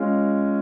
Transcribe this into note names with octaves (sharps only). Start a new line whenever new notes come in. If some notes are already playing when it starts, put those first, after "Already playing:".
Already playing: G#3 C#4 F4